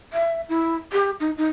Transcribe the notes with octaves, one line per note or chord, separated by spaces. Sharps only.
E5
E4
G4
D#4
D#4